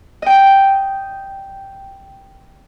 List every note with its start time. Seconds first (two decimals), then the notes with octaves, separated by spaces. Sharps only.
0.22 D#5 G5